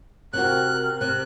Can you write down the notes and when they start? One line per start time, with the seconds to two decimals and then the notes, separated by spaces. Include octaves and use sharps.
0.33 C3 C4 F#4 A#4 F#6
1.01 C3 F#6